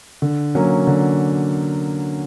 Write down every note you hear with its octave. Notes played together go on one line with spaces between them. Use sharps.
D3
F#3 A#3 C#4
D3